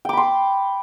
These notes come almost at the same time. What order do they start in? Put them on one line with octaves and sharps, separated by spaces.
G5 D6 B5 C6